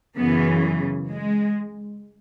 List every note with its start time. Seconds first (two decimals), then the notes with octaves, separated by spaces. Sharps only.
0.17 F#2 C#3 E3 B3
1.10 G#3